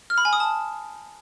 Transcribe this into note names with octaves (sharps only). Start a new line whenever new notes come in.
F6
B5
G#5
D#6
A5